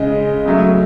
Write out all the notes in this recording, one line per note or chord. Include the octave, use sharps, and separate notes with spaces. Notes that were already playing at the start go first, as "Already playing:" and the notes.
Already playing: C#3 G#3 D#5
C#3 F#3 A3